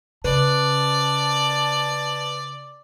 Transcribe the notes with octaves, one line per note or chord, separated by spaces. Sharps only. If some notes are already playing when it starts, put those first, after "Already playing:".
C#3 B4 D5 A5